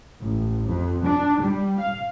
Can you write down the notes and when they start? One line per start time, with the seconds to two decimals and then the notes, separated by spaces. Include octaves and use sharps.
0.20 A1
0.67 F2
1.05 D4
1.41 G3
1.80 F5